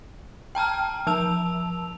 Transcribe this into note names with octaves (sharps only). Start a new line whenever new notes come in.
G5 A5 A#5 F6
F3 A5 E6 F7